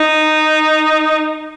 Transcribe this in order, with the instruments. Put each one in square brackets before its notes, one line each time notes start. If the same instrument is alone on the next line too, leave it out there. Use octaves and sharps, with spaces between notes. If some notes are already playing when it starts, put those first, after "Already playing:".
Already playing: [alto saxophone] D#4